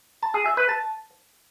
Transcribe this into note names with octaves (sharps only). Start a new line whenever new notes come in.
A5
G#4
E5
B4
A5